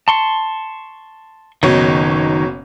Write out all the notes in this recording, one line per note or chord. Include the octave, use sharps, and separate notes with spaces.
A5 C6 C#6
F#1 B2 D#3 D#4 C#5